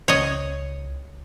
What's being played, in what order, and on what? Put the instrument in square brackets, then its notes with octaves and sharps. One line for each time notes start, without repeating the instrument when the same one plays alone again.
[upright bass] C#2 [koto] C#5 D#5